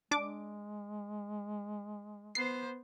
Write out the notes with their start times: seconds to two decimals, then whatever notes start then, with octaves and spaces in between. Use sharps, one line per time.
0.11 G#3 D4 D6
2.35 B3 C5 C7